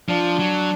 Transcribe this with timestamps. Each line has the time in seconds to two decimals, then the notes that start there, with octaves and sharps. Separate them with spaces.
0.09 F3 D4
0.39 F#3